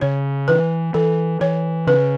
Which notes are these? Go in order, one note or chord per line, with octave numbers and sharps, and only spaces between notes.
C#3 C#5
E3 B4
E3 A4
E3 C#5
C#3 B4